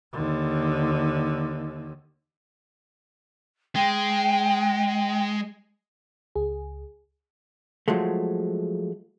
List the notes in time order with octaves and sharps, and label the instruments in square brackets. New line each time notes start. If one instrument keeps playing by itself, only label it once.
[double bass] D#2 D3
[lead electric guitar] G#3 [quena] G5
[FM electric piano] C#2 G#4
[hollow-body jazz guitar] F3 F#3 G#3 A3